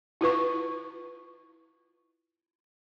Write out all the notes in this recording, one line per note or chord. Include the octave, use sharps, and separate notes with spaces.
E4 F4 B4 C#6